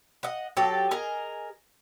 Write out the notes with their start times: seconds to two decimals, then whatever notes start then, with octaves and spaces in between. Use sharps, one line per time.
0.23 D#5 F#5
0.57 F#3 G4 A4
0.91 G#4 A#4 D#5